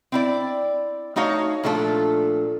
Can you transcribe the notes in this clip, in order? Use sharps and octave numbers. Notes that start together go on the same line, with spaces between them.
C4 E4 D5
A3 D#4 F#4 C#5 F5
A#2 F3 A3 D4 F4 A4